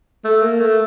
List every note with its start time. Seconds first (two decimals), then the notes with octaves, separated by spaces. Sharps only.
0.24 A3
0.42 A#3
0.60 A3